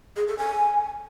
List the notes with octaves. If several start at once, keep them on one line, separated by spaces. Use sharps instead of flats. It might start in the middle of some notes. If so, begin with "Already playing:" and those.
G#4
A4
G#5